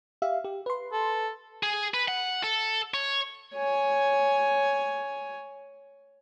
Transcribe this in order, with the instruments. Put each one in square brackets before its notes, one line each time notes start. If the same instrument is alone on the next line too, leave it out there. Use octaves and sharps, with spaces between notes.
[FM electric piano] G4 E5 F5
G4
B4 C6
[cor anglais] A4
[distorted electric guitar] G#4
B4
F#5
A4
C#5
[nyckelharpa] C#5 G#5